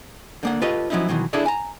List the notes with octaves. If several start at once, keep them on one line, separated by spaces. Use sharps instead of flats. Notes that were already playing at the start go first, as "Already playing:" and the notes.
D3 A#3 F#5
F4 G4 A4 B4 C#5 D#5
F3 F#3 C#4 D#4 E4
B2 D#3 E3 F#3
D4 E4 G#4 A4 C#5 D5
G#5 A#5